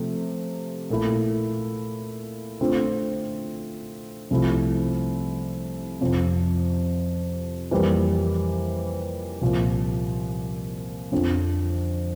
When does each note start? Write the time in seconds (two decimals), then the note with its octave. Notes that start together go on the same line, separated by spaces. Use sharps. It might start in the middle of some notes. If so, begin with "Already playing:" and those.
Already playing: C3 F3 A3
0.90 A#2 A3 E4
2.61 D3 A3 C4 F4
4.31 C2 C3 F3 A3 E4
6.01 F2 C3 F3
7.71 F2 E3 G3 A#3
9.41 C2 A#2 F3
11.12 F2 D3 F3 C4